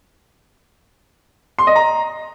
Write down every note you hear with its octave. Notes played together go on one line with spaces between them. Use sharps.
C6
D#5
A#5